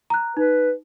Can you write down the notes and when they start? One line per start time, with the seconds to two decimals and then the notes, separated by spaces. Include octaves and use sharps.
0.10 A#5 F#6
0.37 D#4 B4